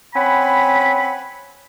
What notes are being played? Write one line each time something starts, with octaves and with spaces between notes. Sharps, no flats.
C4 C#4 F#5 G#5 B5